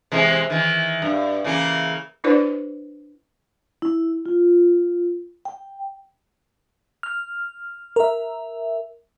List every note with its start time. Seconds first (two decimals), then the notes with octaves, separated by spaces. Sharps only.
0.12 C3 E3 G#3
0.50 D#3 E3
1.02 G2
1.44 C#3 E3 A#3
2.24 D4 E4 G4 B4 C5 D5
3.82 E4
4.26 F4
5.45 G5
7.03 F6
7.96 A#4 E5